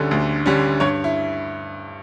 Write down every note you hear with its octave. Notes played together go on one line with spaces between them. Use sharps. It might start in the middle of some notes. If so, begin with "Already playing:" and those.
Already playing: D2 D3 G3 C#4 A4
D2
D3 G3 C#4
G2 C#5
E4